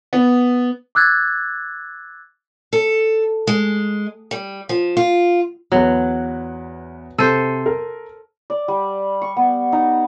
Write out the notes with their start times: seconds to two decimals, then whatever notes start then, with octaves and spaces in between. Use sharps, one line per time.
0.13 B3
0.95 D6 E6 F#6 G#6 A6
2.73 A4
3.47 G#3
4.31 G3
4.69 F3
4.97 F4
5.72 E2 F#3 B4
7.18 C3 A4 C5 D#7
7.66 A#4
8.50 D5
8.68 G3
9.22 C#6
9.37 B3
9.72 D#4